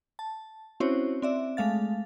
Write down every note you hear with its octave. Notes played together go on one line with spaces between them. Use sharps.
A5
C4 C#4 E4 F#4 C5 C#5
C4 D5 E5
G#3 A3 F5 A6